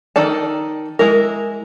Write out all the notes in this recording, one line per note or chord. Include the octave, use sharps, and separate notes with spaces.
D#3 D#4 A4 D5 A5
G#3 E4 A#4